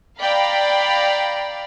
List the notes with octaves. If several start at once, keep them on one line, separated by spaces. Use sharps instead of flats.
D5 F5 G5 A#5 B5